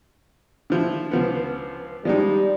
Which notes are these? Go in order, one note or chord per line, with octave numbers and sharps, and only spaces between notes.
D3 F3 E4
C#2 F3 B3
F3 G3 G#3 D#4